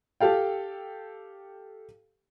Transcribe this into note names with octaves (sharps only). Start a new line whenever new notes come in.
G4 A4 F5 G5